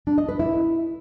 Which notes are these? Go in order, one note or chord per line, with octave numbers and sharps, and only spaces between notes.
D4
D#5
B4
E4